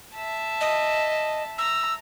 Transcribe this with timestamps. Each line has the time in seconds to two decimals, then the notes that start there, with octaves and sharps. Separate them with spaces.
0.15 E5 A5
0.61 D#5
1.58 A#5 E6